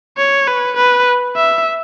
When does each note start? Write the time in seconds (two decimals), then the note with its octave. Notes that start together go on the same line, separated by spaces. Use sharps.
0.18 C#5
0.48 B4
0.77 B4
1.36 E5